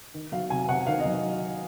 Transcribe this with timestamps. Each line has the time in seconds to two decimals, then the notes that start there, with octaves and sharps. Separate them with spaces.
0.14 D#3
0.32 F#3 F5
0.50 C3 G#5
0.69 C3 F#5
0.87 D#3 F5
0.99 D#5
1.05 F#3